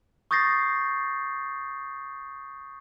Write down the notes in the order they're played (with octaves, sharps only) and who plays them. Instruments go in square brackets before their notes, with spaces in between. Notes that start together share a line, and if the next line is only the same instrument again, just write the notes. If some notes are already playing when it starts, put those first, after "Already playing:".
[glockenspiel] C#6 D#6 G6 A6 A#6 C7